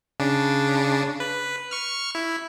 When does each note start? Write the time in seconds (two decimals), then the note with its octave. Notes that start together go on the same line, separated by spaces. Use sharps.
0.20 C#3 D4
1.20 B4
1.71 C#6 F6
2.15 E4